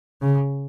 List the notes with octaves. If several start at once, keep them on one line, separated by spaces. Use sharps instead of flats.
C#3